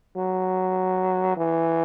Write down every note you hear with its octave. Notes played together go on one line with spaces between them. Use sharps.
F#3
E3